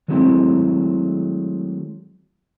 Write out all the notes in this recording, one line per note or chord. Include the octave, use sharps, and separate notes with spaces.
D#3 F#3 G#3 A3 C4 E4